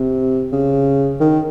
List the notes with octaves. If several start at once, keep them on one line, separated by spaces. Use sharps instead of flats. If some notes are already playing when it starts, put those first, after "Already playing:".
Already playing: C3
C#3
D#3